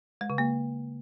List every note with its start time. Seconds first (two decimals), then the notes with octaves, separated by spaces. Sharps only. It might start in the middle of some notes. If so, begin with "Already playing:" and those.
0.21 G#3
0.30 C#3
0.38 A#3